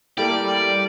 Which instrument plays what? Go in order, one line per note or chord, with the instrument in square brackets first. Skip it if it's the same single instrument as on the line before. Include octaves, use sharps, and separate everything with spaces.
[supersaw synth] G3 [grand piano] A#3 G4 [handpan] E4 A4 A#4 [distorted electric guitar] D5